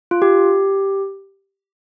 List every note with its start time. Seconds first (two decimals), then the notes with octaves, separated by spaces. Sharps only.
0.11 F4
0.22 G4